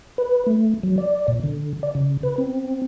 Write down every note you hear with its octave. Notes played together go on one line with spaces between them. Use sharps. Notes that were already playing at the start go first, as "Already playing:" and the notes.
B4
A3
F#3
D5
A#2
D3
D5
C#3
B4
C4